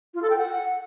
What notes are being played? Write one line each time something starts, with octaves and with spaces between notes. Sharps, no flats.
F4
A4
G5
F#5